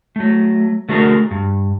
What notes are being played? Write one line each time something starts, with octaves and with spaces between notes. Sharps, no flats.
F#3 A3
D3 A3 F#4 G#4 A#4
G2